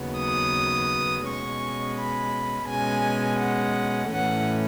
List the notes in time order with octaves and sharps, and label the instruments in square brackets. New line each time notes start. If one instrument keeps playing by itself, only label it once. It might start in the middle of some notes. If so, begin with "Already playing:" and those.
Already playing: [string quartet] D#2 C#3 F#3 B3
D#6
B2 G#3 C#4 C#6
B5
B2 G#3 C#4 G#5
F#5
A2 E3 A3 C#4 F#5